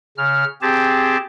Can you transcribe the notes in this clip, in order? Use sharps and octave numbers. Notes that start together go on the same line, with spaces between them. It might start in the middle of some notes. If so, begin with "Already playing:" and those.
C#3 F6
C4 G4 G#4 A5